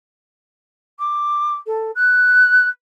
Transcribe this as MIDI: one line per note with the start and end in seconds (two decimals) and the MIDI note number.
0.98 1.55 86
1.66 1.91 69
1.95 2.67 90